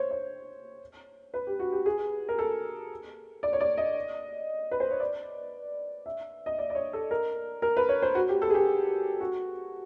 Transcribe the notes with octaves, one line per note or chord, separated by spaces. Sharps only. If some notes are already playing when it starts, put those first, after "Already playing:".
Already playing: C5 C#5
C#5
B4
G4
F#4
G4
G#4
A#4
A4
D5
C#5
D5
D#5
B4
C5
C#5
D5
E5
D#5
D5
D5
C#5
A4
A#4
A#4
B4
C#5
C5
F#4
G4
A4
G#4
G4
F#4